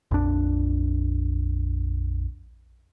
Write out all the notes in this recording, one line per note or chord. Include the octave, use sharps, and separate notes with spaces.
A#1 F2 D4